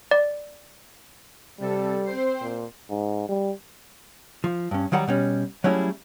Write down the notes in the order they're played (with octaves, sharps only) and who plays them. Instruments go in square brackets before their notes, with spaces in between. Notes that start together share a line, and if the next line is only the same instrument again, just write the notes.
[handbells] D5
[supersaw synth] C3 A4 [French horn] G3
[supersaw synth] C4 C5 C7
[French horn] A#2
[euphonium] G#2
G3
[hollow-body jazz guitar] F3
G2 C#4
D#3 F#3 G3 F#5 A#5
B2 G3 C#4
F#3 G3 A3 C#4 E4 G#4